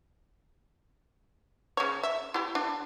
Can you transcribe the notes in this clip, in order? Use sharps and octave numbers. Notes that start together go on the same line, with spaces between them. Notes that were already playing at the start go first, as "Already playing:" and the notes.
C#3 C#5
E5
E4 G4
D4